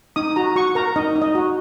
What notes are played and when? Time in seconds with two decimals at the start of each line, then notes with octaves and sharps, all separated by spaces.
0.16 D#4 D#6
0.36 F#4 A#5
0.56 F#4 C#6
0.75 A#4 A#5
0.96 D#4 D#5
1.15 D#4
1.22 D#5
1.35 F#4